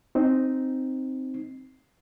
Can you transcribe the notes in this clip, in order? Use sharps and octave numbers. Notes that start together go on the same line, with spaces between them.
C4 D#4